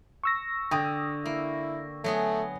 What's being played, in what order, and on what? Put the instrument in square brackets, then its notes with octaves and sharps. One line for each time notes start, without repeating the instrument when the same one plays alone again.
[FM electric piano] C#6 E6 A#6
[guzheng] D3 [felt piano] G5 D#6
[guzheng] A#3 [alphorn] E4
[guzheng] F#3 B3 G#4 [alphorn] A3